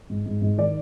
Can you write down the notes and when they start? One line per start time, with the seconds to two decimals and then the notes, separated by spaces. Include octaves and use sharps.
0.10 G#2
0.26 G#2
0.42 G#2
0.58 D#3 D5